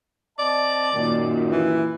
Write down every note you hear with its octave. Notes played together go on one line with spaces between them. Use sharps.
C4 D5 D#5 A5
F#2 A#2 D#3
E3